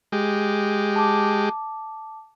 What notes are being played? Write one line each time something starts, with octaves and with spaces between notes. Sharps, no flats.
G#3 G4
A5 D6